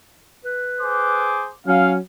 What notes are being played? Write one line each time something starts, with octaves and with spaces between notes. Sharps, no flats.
B4
G#4 C5 D6
F#3 C#4 F5